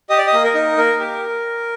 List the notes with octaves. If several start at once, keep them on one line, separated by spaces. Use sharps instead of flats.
G4 D#5
D5
D#5
A#3
A#4
D#4
A#3 A#4
G4